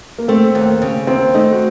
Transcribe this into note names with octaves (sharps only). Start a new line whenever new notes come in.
A#3
A3 C4
D#2
C#3
D#2 C4
A3 D#4
F#4